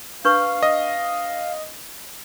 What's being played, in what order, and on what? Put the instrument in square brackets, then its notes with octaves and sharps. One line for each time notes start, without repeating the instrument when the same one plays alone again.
[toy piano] D4 B4 C#6 [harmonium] F5
[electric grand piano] D#5